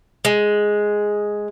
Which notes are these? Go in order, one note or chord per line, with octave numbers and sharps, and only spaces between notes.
G#3